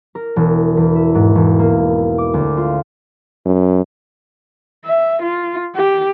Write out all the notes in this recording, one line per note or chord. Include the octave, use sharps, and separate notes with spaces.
A#4
E1
E2
E5
G#2
E1
A#3
D6
D2
F4
F#2
E5
F4
G4